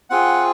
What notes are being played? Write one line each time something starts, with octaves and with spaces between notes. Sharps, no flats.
C4 F4 G#4 F#5